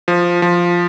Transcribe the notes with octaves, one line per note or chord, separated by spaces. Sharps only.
F3
F3